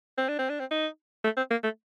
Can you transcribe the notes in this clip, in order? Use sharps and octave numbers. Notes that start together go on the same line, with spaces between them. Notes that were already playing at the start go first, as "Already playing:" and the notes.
C4
D4
C4
D4
C4
D#4
A3
C4
A#3
A3